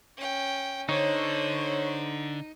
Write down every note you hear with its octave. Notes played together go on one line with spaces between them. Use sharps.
C#4 G5
D3 D#4 C5 C#5